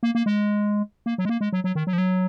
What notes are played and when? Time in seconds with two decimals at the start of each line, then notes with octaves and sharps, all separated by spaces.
0.03 A#3
0.15 A#3
0.26 G#3
1.06 A#3
1.18 F#3
1.25 G#3
1.29 A#3
1.41 G#3
1.53 F#3
1.64 F#3
1.75 D#3
1.87 F#3
1.93 F3
1.98 F#3